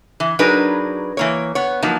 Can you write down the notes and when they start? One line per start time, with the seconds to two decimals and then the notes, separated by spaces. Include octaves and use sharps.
0.20 E3
0.39 F#3 D4 D#4 G#4 A#4 B4
1.17 E3 A#3 C#5
1.55 B3 C#5
1.82 F3 F#3 A#3 D#4